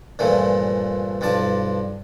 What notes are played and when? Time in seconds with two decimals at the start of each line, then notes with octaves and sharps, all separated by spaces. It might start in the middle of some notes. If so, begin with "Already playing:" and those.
0.19 G2 A#2 E3 F3 A3
1.21 B1 G2 F3 D5 A5